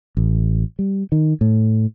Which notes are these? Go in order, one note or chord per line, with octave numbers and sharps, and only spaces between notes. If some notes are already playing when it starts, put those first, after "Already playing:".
A1
G3
D#3
A2